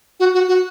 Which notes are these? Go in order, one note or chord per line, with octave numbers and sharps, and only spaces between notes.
F#4
F#4
F#4